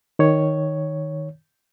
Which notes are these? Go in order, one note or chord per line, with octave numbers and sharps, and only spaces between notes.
D#3 C#5